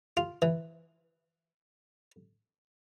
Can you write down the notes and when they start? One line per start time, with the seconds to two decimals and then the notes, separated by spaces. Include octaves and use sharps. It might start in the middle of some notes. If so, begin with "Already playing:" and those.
0.17 F4
0.42 E3